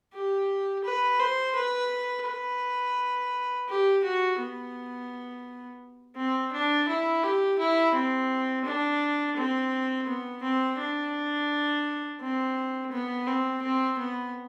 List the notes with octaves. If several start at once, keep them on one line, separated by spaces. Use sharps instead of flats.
G4
B4
C5
B4
B4
G4
F#4
B3
C4
D4
E4
G4
E4
C4
D4
C4
B3
C4
D4
C4
B3
C4
C4
B3